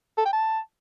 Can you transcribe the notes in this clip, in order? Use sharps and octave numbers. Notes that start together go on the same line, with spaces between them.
A4
G5
A5